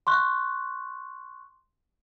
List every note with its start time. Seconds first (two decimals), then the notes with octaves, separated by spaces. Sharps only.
0.07 C6 C#6 F#6